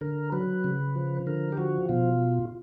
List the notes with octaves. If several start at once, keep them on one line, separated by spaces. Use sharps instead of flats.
D3 A#4
F#3 B4
C#3
F3
D3 A#4
G4
F3 F#4
B2 F4